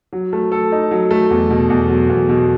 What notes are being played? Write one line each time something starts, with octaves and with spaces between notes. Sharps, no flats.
F#3
A3
A4
D#4
F#3
A3
E2
B2
E2
F#3
E2
B2